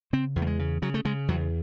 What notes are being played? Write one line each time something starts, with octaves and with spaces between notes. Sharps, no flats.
C#3 C4
E2
A3
G#3
C#3
C#3 F#3
A3
C#3 G#3
E2 F#3